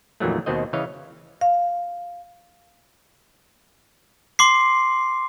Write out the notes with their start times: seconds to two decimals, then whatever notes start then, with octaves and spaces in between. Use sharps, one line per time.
0.20 F2 A#2 D#3 E3 F#3 A3
0.46 D#2 B2 D#3 C4 C5 D#5
0.73 C#3 E3 C#5 D#5 F5
1.41 F5
4.39 C6 D6 C7